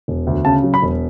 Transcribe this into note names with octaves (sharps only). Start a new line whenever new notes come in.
E1
D2
C#3 A5
F#3
B5
E1